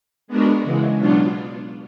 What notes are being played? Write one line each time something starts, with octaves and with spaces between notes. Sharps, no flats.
G#3 B3 D4 F#4 A#4
C#3 E3 G#3
B2 F#3 B3 D4 F4